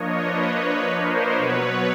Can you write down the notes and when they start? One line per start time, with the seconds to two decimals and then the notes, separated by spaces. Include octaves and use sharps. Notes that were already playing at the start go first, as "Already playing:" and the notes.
Already playing: F3 A#3 D4 C#5 D#5
0.24 B4 C#5
0.99 A#4 C5
1.36 B2 F#3 B3 B4 C#5